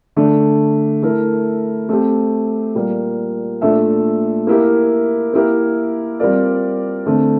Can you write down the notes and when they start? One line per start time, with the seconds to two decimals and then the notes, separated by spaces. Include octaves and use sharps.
0.16 D3 A3 D4
1.03 A3 E4 A#4
1.89 A3 C4 G4
2.75 A#2 G3 A#3
3.61 A#2 A3 D4 A4 E5
4.47 A#3 E4 G4 A#4
5.34 A#3 E4 G4 A#4
6.20 G3 C4 F4 A#4 D5
7.06 D3 A3 C4